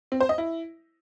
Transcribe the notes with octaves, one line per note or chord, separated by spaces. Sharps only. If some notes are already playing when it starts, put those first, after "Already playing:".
C4
C5
D#5
E4